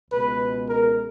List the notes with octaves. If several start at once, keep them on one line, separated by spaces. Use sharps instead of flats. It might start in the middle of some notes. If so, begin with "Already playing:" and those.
C#2 B2 G#3 B4
A#4